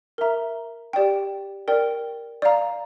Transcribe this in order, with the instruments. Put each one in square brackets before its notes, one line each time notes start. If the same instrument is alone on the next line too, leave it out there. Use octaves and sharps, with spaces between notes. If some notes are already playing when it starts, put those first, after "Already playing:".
[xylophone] A#4 E5 A#5
G4 D5 G5
A#4 D5 G5
D5 F5 A#5